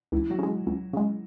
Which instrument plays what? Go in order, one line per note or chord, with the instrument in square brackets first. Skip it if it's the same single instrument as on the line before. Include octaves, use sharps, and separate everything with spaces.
[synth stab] C#2 [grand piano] E3 E4
[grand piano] F#3 F#4
[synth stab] C#3 G#3
C#2
C#3 G#3